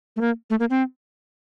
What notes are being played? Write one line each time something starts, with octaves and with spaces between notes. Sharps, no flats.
A3
A#3
A3
A#3
C4